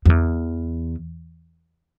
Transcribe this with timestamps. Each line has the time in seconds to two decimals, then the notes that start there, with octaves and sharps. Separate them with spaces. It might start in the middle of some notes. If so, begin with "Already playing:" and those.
0.06 F2
0.10 E2